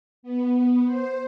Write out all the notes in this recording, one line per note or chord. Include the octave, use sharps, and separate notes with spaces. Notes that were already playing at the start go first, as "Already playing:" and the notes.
B3
C5